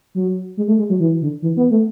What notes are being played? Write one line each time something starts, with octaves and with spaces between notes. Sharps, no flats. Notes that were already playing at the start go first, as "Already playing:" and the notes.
F#3
G#3
A3
G#3
F#3
E3
D3
E3
B3
A3